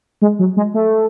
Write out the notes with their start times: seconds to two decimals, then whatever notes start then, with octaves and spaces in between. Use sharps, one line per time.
0.22 G#3
0.39 F#3
0.57 G#3
0.74 A3